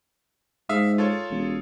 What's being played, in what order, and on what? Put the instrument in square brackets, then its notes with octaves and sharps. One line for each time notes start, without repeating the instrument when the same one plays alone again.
[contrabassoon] G#2 [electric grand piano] E5 F5 D#6
[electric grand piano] F4 A4 C#5
[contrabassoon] E1